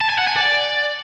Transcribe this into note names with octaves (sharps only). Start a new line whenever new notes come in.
A5
G#5
F#5
G#5
D5